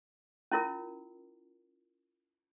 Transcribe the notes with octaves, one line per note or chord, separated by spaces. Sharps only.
C#4 E4 F4 A#4